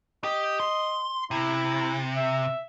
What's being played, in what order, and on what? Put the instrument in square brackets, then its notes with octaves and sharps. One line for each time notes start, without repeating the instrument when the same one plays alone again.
[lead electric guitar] G4 [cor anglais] D#5
[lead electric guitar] C6
[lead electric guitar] C3 [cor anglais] E4
[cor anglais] E5